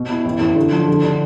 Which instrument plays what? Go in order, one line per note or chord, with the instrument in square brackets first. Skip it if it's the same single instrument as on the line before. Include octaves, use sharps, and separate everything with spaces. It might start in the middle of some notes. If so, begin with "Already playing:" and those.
Already playing: [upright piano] B2
E4
A1
A1
D3
F3
D3
D3